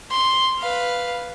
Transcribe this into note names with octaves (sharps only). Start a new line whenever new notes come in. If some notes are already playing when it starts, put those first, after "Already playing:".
C6
B4 F5